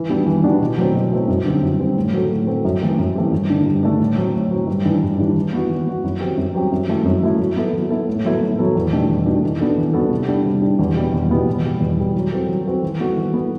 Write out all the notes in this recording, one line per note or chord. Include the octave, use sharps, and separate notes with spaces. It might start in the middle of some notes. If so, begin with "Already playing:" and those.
Already playing: E3
G3 B3 D4 F#4
E3
G3 B3 D4 F#4
B2
F#3 A3 C4
B2
F#3 A3 C4
F#2
D3 G3 C4
F#2
D3 G3 C4
A2
F#3 C4 F#4 A4
A2
F#3 C4 F#4 A4
F#2
E3 A3 C4 G4
F#2
E3 A3 C4 G4
G2
D3 A3 D4
G2
D3 A3 D4
A2
F#3 C4
A2
F#3 C4
G2
E3 G3 D4
G2
E3 G3 D4
E3
B3 F#4
E3
B3 F#4
F#2
F#3 C4 G4
F#2
F#3 C4 G4
F#2
F#3 A3 E4
F#2
F#3 A3 E4
F#3
B3 E4 A4
F#3
B3 E4 A4
A2
F#3 B3 E4 A4
A2
F#3 B3 E4 A4
E2
B2 A3 D4 G4
E2
B2 A3 D4 G4
E3
B3 D4 F#4 A4
E3
B3 D4 F#4 A4
C3
G3 D4
C3
G3 D4
E2
B2 G3 B3 E4
E2
B2 G3 B3 E4
E2
B2 G3
E2
B2 G3
F#3
C4 F#4 A4
F#3
C4 F#4 A4
E3
B3 F#4 A4
E3
B3 F#4 A4